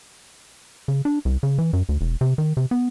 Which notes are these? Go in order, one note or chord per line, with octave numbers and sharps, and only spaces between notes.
C#3
D4
C2
C#3
E3
F#2
D2
E1
C3
D#3
C3
B3